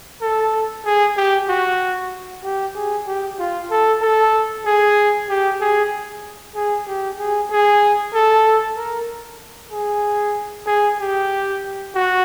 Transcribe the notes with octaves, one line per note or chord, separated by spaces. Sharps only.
A4
G#4
G4
F#4
G4
G#4
G4
F4
A4
A4
G#4
G4
G#4
G#4
G4
G#4
G#4
A4
A#4
G#4
G#4
G4
F#4